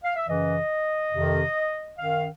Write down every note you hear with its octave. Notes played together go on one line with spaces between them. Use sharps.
F5
E5
F#2 C#3 E3 D#5
F2 C3 D#3
F#2 D#3 F5